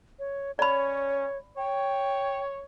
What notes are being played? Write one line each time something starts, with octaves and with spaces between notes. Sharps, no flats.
C#5
C#4 C#5 D5 B5
C#5 G5